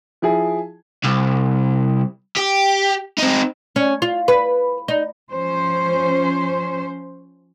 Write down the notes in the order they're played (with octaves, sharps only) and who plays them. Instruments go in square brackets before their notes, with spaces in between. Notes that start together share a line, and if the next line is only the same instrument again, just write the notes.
[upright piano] F3 E4 G#4
[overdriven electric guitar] C2
G4
C4 D#4
[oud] C#4
F4
B4
D#4
[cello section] F3 C#4 C5